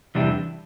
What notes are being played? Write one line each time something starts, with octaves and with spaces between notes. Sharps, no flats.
E2 C3 E3 G3 D4